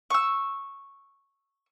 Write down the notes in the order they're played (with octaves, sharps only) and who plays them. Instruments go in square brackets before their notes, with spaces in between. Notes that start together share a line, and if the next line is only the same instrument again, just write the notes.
[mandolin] C#6 E6